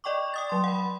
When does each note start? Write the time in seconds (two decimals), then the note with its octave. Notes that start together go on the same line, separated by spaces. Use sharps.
0.04 D5 D#5 G5 C#6 D6
0.34 G5 D#6 A6
0.49 F#3 C6
0.64 F#5 B5